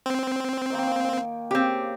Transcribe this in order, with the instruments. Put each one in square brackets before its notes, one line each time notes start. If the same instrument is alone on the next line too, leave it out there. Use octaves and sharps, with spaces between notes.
[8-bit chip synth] C4
[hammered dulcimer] D#3 A#3 G5
[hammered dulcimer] C#3 [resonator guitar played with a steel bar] C4 G4